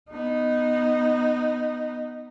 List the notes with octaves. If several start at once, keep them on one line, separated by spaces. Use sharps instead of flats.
B3 D#4